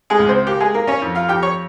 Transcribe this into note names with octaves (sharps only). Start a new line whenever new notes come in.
G#3 G#4
C#2
C4 C5
A#3 G4
G#3 G#4
A#3 A#4
C#4 C#5
F2
F4 F5
F2 G4 G5
C#5 C#6